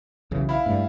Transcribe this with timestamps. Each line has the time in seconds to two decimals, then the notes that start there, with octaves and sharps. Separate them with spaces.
0.31 B1 C#3 E3
0.49 E4 F5 B5
0.66 G2 F#3 G3 A3